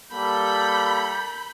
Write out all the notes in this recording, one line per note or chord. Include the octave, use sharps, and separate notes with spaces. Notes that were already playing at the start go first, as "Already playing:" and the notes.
G3 A#3 A4 B5 G6